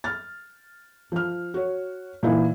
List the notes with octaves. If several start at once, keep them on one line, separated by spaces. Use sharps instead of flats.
F6 A6
F3 F6
F#4 C#5
A#2 E3 D#4 E4